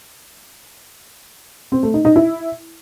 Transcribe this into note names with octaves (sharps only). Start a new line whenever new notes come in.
C4
A3
D#4
D#4
E4